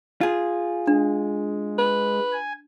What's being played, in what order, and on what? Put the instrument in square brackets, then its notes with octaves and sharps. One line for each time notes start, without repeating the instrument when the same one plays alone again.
[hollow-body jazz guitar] F4 G#4
[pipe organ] G#3 [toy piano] D4
[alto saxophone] B4
[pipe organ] G#5